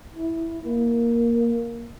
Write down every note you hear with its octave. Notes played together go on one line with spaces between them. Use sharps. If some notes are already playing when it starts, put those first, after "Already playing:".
E4
A#3